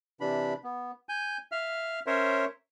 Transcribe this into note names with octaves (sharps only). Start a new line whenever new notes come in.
C3 E3 D4 B5
B3
G#5 G6
E5 F5 F6
C#4 A#4 C5 C#5 E5